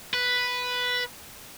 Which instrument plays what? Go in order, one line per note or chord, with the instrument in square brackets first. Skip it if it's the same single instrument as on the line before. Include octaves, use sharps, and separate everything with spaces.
[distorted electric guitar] B4